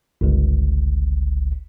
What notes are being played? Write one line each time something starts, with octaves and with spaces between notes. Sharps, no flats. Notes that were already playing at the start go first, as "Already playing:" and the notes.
G1 C#2